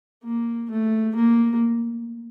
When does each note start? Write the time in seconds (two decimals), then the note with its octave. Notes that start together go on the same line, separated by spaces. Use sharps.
0.24 A#3
0.70 A3
1.15 A#3